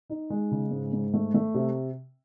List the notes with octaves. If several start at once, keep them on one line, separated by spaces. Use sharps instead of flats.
D#4
G#3
C#3
G#2
G#2
A3
A3
C3